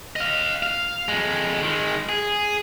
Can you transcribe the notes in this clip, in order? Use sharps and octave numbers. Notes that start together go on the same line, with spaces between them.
D#5 F5
F5
F2 G#3
D#3 G#3
G#4